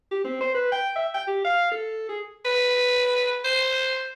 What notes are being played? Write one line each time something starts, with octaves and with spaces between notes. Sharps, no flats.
G4
C4
C5
B4
G5
E5
G5
G4
F5
A4
G#4
B4
C5